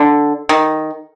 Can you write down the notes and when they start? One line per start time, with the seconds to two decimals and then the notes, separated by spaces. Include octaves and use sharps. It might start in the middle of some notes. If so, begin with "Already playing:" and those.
Already playing: D3
0.49 D#3